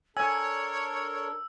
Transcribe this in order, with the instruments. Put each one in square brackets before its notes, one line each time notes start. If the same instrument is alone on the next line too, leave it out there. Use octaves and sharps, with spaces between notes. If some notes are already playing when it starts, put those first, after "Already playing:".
[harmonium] D4 A4 A#4 [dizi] C#5 [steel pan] G#5 [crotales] E6